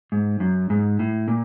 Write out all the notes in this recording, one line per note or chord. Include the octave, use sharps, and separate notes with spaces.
G#2
F#2
G#2
A2
A#2